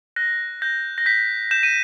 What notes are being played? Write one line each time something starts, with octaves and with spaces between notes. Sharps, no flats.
F#6 A#6
G6 A#6
A#6
G6 B6
G6 E7
D#7